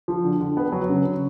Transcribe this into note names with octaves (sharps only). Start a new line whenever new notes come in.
F3
D3
D3
B3
F#3
C#3
C#3